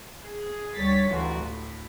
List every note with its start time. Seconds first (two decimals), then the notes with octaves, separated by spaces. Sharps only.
0.25 G#4
0.75 D2 G3 C#5 A6 B6
1.08 A1 D2 E3 F4 F#4
1.37 A2